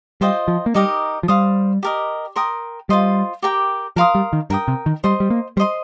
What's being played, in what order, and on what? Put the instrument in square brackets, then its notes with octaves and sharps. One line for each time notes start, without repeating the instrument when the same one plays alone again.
[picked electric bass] G3 [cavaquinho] F4 C5 D#5 G5
[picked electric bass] F3
A#3
[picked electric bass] G3 [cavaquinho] D#4 G4 A#4 D#5
[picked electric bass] F3
[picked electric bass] G3 [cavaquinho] C5 F5 D#6
[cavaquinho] G4 A#4 D#5
A#4 G5 C6 D#6
[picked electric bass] G3 [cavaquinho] F4 C5 D#5 C6
[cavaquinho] G4 A#4 G5
[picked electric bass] F3 [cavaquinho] A#4 F5 C6 D#6
[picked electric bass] G3
D#3
[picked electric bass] G2 [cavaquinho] A#4 G5 D#6
[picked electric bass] C3
D#3
[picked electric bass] G3 [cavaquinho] C5 D#5 C6
[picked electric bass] G3
A#3
[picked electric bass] G3 [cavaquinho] C5 D#5 C6